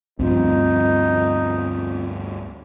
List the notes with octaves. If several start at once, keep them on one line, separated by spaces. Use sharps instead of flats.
D2 G2 F3 C4 D#4 F4